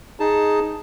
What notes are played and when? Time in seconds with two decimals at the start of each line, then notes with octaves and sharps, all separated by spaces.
0.20 D#4 G#4 A5